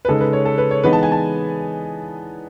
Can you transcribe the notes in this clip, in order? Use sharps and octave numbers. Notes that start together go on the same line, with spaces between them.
B4
C#3 G#3 D#4 A4
B4
C#5
A4
B4
C#5
E3 G#3 B3 D#4 B4
A5
G#5
A5